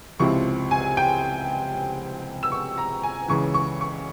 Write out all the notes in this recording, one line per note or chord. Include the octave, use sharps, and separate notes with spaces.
C#2 C3 F3 C4 E4 C#6
G#5
G5
E6
C#6
A#5
G#5
C#2 C#3 E3 C#6
C#6
C#6